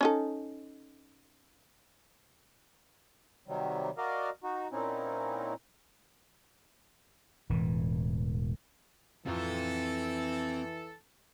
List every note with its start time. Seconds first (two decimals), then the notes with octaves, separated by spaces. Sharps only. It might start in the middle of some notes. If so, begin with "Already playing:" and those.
0.01 C#4 D#4 A4
3.48 C3 D#3 F#3 G3
3.97 F#4 A#4 D5 D#5 F5
4.44 D#4 F#4
4.72 A#2 C4 C#4 D#4 E4
7.50 E1 A2 E3
9.26 F2 E3 C4 F4 A4 A#5